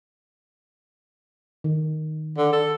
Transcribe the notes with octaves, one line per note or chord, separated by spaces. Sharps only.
D#3
D3
A4